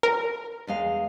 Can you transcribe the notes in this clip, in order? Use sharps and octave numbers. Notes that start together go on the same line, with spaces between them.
A#4
E2 G#3 F5